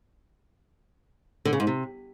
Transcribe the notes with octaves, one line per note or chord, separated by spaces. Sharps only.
D3
C#3
G#2
C3